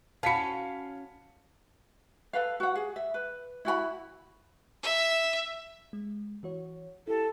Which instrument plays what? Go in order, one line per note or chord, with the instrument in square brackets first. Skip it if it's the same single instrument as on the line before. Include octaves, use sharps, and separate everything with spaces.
[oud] C#4 F#4 [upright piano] F5 B6 C#7 [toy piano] A5 B5
[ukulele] A4 B4 F5
F#4 F#5
G#4
E5
B4
E4 F#4 G5 B5
[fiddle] E5
[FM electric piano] G#3
E3 F#4 C#5
[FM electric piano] E4 G4 [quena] A4